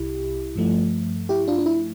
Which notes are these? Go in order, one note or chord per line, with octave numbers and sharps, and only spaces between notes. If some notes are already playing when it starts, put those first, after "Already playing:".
Already playing: C2 C3 E4 G4
G2 F3 A3
E4 G4
D4 F4
D4
E4